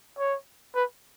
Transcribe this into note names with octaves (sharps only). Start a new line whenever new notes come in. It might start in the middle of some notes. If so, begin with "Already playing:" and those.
C#5
B4